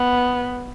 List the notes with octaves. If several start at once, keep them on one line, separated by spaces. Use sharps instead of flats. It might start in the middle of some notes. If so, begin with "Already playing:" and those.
Already playing: B3